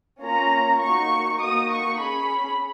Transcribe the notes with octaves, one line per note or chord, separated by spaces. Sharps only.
A#3 C#4 F4 A#5
A#3 D#4 F#4 C#6
A#3 D#4 F#4 D#6
C#6
C#4 G#4 B5